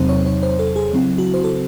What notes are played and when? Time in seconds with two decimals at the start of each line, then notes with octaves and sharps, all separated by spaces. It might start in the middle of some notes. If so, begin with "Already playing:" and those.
Already playing: E2 C3 F#3 C4 D#4 C5
0.09 C#5
0.26 C#5
0.43 C5
0.59 A4
0.76 G#4
0.93 C#3 F#3 C4 E4
1.18 F#4
1.34 C5
1.44 A4